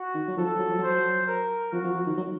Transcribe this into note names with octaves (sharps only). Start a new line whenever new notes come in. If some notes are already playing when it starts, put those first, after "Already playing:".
Already playing: F#4
D#3
F#3
F3 A4
F#3
F3
F#3 C5
A#4
F3 F#4
F3
F3
D#3
F#3